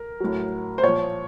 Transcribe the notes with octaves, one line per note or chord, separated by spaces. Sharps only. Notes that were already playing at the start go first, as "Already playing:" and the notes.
Already playing: A#4
A2 F#3
C5
A#2 F3 C#5